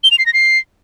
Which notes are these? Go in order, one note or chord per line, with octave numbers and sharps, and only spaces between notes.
G7
F7
C7
A#6
C7